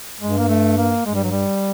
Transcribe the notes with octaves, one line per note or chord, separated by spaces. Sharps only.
G2 G#3
A#3
A3
A#3
G2 G#3
G3
F#3
G3